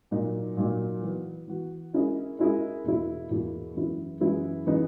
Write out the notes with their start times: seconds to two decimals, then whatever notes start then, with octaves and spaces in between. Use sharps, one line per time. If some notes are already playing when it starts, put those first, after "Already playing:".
0.11 A#2 F#3 A#3 D#4
0.57 A#2 F#3 A#3 D#4
1.02 E3 B3 F#4
1.48 E3 B3 F#4
1.93 G#3 C#4 E4 A#4 D#5
2.39 G#3 C#4 E4 A#4 D#5
2.84 E2 B2 A#3 E4
3.29 E2 B2 A#3 E4
3.75 F#2 E3 G#3 B3 E4
4.20 F#2 E3 G#3 B3 E4
4.66 C#3 E3 B3 D#4